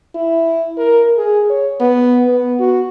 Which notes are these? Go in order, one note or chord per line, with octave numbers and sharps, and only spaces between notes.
E4
A#4
G#4
C#5
B3
B3
F#4